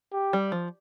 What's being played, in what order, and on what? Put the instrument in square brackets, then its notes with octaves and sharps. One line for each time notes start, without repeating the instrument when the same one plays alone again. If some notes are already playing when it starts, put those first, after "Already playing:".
[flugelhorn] G4
[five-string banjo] G3
F3